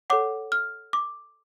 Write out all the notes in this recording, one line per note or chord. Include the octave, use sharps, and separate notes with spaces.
A4 C#5 F#5 D6
F6
D6